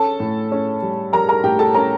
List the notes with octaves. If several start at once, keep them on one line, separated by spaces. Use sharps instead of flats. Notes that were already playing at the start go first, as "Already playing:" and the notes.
Already playing: C#4 A4 A5
A2
C#4
G3
G3 A#4 A#5
A#4 A#5
A2 G4 G5
A4 A5
C#4 A#4 A#5